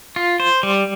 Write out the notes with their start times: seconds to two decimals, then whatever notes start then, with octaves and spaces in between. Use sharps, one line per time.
0.16 F4
0.40 C5
0.63 G3